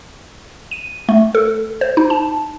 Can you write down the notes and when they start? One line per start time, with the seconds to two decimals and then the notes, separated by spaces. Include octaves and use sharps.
0.71 D#7
1.09 A3
1.35 A4
1.81 C5
1.97 D#4
2.10 A5